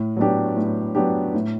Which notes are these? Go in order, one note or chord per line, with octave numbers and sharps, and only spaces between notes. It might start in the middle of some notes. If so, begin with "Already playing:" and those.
Already playing: A2
F#3 B3 D4 G4
A2
F#3 B3 D4 G4
A2